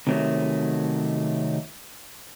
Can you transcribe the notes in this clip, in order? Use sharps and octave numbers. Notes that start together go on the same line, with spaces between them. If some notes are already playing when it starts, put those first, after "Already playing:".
C3 D#3 F#3 A3